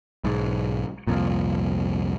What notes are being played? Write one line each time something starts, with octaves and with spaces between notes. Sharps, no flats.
B1 G#2
C2 F2 A#2